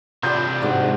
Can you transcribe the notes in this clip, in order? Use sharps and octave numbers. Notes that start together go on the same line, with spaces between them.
C3 G3 D4 F4 G6
G#2 F#4 D5 F5